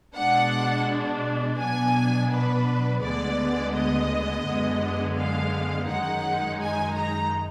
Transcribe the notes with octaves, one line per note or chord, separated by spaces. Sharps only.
B2 G#3 D4 F#5
B2 F#3 B3 D4 G#5
B4
D2 D3 G#3 B3 D5
D#5
F#2 D3 G#3 B3
F5
F#2 D#3 G#3 D#4 F#5
G#5
A#5